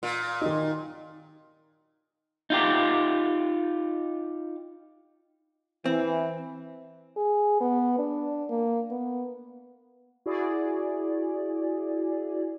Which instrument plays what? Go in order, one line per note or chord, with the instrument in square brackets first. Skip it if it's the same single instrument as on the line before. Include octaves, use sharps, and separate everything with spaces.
[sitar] A#2
[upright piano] D#3 D#4
[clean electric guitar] D#4 F4 G4
[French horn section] E3 [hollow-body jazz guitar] C4
[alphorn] G#4
B3
D4
A#3
B3
[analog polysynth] E4 F#4 G#4 D5